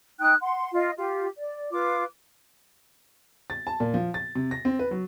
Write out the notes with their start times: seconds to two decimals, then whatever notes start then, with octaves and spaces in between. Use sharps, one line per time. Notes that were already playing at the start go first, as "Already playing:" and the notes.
0.20 D#4 G5 D#6 F#6
0.40 F#5 C6
0.73 F4 D#5
0.97 F4 G4
1.37 D5
1.72 F4 B4 D6
3.50 A6
3.67 A5
3.80 A#2
3.94 F3
4.14 A6
4.35 C3
4.51 A#6
4.65 C4
4.79 B4
4.91 F#3